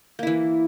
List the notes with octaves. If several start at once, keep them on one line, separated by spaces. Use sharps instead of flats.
E3 A#3 E4